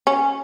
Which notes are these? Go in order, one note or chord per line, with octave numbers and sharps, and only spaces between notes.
C#4